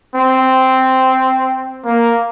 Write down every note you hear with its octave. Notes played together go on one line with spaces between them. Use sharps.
C4
A#3